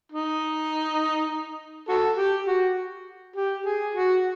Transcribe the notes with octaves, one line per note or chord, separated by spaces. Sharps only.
D#4
F#4 A4
G4
F#4
G4
G#4
F#4